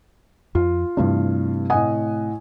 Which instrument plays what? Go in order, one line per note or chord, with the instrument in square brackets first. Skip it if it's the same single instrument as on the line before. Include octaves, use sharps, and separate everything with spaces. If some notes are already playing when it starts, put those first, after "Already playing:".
[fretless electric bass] F2 [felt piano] F4
[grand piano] G2 E3 [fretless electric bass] C3 A3 C4
[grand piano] A2 D#6 [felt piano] D#5 F#5 G#5